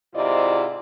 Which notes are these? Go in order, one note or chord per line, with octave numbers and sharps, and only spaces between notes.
G#2 C3 E4 F4 D5 D#5